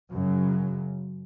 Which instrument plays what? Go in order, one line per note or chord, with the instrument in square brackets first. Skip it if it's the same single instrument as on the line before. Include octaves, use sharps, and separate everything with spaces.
[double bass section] F#2 C#3 F#3